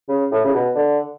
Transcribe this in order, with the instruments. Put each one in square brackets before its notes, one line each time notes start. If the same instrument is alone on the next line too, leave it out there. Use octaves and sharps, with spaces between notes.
[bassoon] C#3
A2
C#3
B2
D3